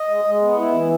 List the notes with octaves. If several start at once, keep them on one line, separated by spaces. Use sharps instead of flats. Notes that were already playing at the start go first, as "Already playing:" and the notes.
Already playing: D#5
G#3
G#3
B3
E4
E3